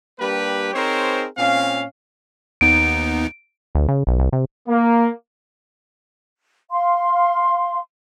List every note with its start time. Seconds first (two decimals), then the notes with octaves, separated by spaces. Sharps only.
0.19 G3 A#3 D4 G4 B4
0.74 C4 D#4 G#4 A#4 C5 C#5
1.38 A#2 C4 C#4 F5
2.61 D#2 B3 D#4 D7
3.75 D2
3.88 C#3
4.07 B1
4.19 C2
4.33 C3
4.69 A#3
6.71 F5 C6